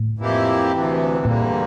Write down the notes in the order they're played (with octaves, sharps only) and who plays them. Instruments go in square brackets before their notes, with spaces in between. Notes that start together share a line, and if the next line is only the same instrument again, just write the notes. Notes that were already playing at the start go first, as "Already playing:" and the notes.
Already playing: [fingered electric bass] A2
[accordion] F2 E3 A#3 E4 G4
D2 C3 E3
[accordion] E2 D3 G3 A#3 [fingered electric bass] A#2